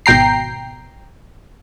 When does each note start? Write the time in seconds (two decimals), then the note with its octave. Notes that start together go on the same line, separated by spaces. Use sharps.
0.06 G#1 B2 G5 A#5 C7